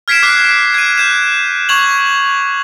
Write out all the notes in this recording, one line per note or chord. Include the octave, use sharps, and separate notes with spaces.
F6 G#6 B6 C7 D7 E7
D6 F6 F#6 G#6 C7
G#6 D#7
F#6 G6 E7
C#6 G#6 F7 F#7